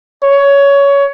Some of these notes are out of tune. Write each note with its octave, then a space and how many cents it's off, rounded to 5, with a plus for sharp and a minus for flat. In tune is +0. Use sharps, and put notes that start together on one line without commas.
C#5 +15